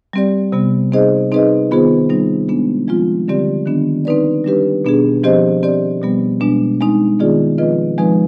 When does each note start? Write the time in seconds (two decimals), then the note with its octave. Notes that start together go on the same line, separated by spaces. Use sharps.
0.13 G3 C4 G4 D5
0.52 C3 G3 B3
0.92 C4 D#4 G#4 C5 D#5
1.32 C4 D#4 G#4 B4 D#5
1.71 D#3 B3 F4 G#4 C5
2.09 G3 C4 D#4
2.48 G#3 B3 D4
2.88 F3 G#3 C4 F4
3.28 D3 G3 C4 G4 D5
3.66 D#3 B3 D4
4.05 C4 D#4 B4 D5
4.44 G3 D4 G4 B4
4.85 B2 B3 D4 G#4
5.23 F3 C4 G4 C5 D#5
5.63 C4 G4 D5
6.02 B2 G3 B3
6.40 B2 G#3 B3 D4
6.81 G#3 C4 D#4
7.19 D#3 B3 F4 G#4 D5
7.58 F3 C4 F4 B4 D#5
7.98 F3 G#3 C4 D#4 B4